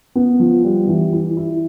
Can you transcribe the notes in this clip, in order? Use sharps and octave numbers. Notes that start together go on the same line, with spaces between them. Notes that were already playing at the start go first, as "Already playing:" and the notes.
B3
F3
G3
E3
E4
E4